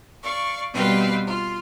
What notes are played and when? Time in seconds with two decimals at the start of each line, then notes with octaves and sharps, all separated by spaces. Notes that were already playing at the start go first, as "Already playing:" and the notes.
0.23 D5 F5 C#6
0.73 B2 G3 C4 B4 F5 G5
1.28 F4